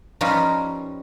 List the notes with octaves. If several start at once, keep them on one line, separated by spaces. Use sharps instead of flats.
F3 G3 C#4 D#4 F4 B4